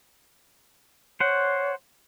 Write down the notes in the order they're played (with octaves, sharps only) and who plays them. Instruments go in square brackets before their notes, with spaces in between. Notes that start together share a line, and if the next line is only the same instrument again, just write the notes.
[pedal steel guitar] C5 F#5 [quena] C#5